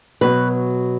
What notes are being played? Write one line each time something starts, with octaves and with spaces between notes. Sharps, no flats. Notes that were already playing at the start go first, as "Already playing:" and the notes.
B2 F#3 B4